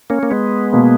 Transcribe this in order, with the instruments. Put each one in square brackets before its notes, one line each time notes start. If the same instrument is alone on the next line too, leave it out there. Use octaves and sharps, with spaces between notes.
[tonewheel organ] A#3 C#4
A#3
G#3 B3
[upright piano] B2 A#3